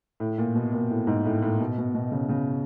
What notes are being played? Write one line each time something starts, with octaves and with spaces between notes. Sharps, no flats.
A2
A#2
B2
A#2
A2
G#2
A2
A2
B2
B2
B2
C#3
C#3